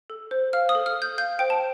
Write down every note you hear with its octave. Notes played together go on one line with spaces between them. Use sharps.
A4
C5
F5 F6
D#6
A4
F6
A4 G6
F5 G6
C5 G5
A5